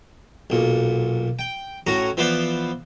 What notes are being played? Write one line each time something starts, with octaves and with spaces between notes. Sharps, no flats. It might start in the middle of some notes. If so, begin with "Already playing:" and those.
B1 A#2
G5
A2 C#4 F#4 A#5
E3 F3 B3 B4 C5 D5